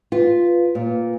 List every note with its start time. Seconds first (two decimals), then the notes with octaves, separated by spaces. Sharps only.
0.12 F4 B4
0.75 A#2